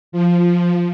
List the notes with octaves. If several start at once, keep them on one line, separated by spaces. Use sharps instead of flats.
F3